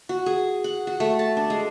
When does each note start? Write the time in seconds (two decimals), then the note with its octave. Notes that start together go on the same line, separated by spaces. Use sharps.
0.09 F#4
0.26 G#4
0.64 F#5
0.87 F#4
1.00 A3
1.19 A5
1.37 D4
1.50 G#3